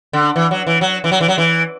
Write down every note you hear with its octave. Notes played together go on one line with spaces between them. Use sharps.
D3
E3
F#3
E3
F#3
E3
F#3
E3
F#3
E3